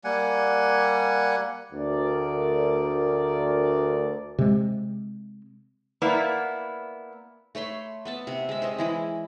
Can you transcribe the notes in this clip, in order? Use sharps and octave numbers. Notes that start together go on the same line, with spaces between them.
G3 A#3 F#5 G#5
D2 A#4 D5
C3 G#3
A#3 B3 E4 D5
A3 C#5 B5 C6
B3 E5 A5
C3 F#5
G#3 E5
C5 C#5 D#5
E3 G#3 E4